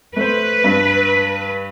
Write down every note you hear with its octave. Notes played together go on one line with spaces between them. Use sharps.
A3 B4 C5
G2